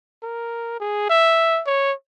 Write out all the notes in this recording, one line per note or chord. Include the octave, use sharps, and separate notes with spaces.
A#4
G#4
E5
C#5